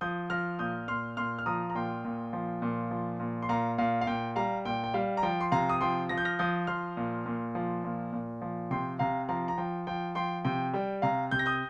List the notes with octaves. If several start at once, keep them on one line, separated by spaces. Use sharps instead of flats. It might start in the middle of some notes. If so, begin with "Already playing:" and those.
F3 D#6 G6
F3 F6 A#6
A#2 D#6 G6
A#2 C6 F6
A#2 C6 F6
F6
F3 A#5 D#6
A#5
A#2 G5 C6
A#2
F3
A#2
F3
A#2
C6
A#2 F5 A#5
A#2 F5
F5
A#2 G5
G3 F5 A#5
A#2 G5
G5
G3 F5
A#5
F3 G5
C6
C3 F5 A#5
D#6
F3 G5 C6
F3 A#6
G6
F6 A#6
F3 D#6 G6
F3 C6 F6
A#2
A#2
F3
A#2
A#2
F3
C3 G5 C6
C3 F5 A#5
F3 F5 A#5
A#5
F3 G5
F3 G5
F3 G5 C6
C3 G5
G3 G5
C3 F5 A#5
C3 G6
A#6
D#6 G6